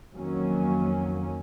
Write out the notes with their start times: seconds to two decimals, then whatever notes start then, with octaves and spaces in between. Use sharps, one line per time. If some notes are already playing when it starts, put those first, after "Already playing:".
0.14 F2 D#3 F#3 A#3 C#4